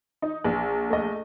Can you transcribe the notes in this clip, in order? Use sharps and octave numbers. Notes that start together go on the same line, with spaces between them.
D#4
A#1
A3 D#5